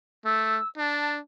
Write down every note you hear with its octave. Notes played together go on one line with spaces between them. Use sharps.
A3 E6
D4 A5